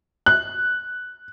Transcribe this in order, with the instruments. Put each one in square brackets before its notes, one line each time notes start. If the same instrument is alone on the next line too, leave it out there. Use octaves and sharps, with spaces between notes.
[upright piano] F#6